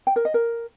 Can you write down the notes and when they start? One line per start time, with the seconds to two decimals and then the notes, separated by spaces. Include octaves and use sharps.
0.07 G5
0.16 A#4
0.25 D#5
0.34 A#4